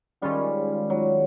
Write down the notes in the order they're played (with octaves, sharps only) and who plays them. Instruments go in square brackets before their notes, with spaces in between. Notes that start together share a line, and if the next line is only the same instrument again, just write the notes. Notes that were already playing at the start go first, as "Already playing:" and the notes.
[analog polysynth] D#3 G#3 C#4 F4 [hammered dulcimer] G3
[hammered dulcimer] F#3